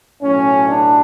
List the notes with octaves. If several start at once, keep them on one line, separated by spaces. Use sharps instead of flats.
B1 A2 F#3 C#4
D4